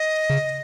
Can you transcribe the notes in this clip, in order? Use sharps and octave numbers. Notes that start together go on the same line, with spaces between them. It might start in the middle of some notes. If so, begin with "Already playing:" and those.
Already playing: D#5
C#3